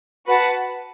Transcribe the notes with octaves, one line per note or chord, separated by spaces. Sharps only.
F#4 B4 F#5 A5